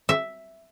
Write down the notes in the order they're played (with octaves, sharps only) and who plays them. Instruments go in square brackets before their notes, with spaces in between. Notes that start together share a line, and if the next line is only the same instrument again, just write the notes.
[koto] E5